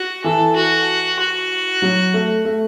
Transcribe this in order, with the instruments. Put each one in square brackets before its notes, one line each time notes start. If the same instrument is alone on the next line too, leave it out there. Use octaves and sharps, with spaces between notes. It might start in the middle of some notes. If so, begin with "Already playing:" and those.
Already playing: [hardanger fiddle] F#4
[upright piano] E3 [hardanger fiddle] A4
[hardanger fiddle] F#4
F#4
[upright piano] F#3
A3
A3